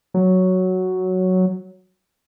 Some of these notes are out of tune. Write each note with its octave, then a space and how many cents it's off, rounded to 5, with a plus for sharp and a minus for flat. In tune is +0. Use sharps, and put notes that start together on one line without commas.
F#3 +0